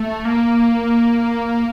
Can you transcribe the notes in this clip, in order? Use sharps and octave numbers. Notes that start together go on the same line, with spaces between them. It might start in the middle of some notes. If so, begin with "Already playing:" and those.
Already playing: A3
A#3